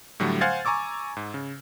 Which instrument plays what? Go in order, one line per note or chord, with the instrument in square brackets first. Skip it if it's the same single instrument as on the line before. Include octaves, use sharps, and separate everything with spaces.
[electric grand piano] A2 D3 F#3 G3 A3
C5 F5 F#5 G#5 G#6 A6
G#5 A#5 C#6 D6 E6
G#2
C#3